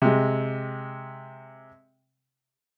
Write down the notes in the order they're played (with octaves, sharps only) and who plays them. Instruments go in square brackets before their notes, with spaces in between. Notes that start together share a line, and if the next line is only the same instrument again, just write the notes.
[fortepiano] C3 G#3